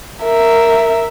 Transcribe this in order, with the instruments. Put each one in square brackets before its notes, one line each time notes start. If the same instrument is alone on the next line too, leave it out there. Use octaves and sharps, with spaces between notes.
[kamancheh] A#4 E5